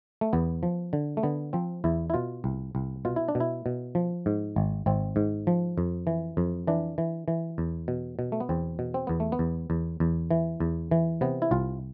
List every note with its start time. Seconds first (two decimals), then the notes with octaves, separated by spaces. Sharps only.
0.21 A3
0.33 E2 B3
0.63 F3
0.93 D3
1.17 A3
1.23 D3 B3
1.53 F3 C4
1.84 E2 E4
2.10 E4
2.14 B2 F4
2.44 C2
2.75 C2
3.05 B2 F4
3.16 E4
3.28 D4
3.35 B2
3.40 E4
3.66 B2
3.95 F3
4.26 G#2
4.56 G#1
4.86 G#1 C4
5.16 G#2
5.47 F3
5.78 F2
6.07 E3
6.37 F2
6.67 E3 D4
6.98 E3
7.28 E3
7.58 E2
7.88 B2
8.19 B2
8.32 A3
8.40 B3
8.49 E2 C4
8.79 B2
8.94 C4
9.07 E2 B3
9.20 A3
9.32 B3
9.39 E2
9.70 E2
10.00 E2
10.31 E3
10.60 E2
10.91 E3
11.21 C3 B3
11.42 E4
11.51 C2 F4